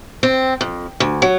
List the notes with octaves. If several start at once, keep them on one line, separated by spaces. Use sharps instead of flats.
C4
F2
D2
F#3